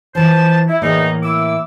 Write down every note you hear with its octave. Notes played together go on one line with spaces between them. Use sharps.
E3 F3 B4 C5 A5
E4
E2 A2 E3 A#3 D#4
E4 D6 E6